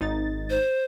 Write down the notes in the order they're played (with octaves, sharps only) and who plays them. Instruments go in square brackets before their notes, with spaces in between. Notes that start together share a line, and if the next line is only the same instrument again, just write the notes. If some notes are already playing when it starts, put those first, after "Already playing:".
[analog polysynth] G#1 D#4 A6
[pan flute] C5